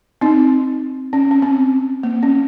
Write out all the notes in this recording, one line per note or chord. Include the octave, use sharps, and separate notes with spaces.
C4 D#4
C#4
C#4
C4
A#3
C#4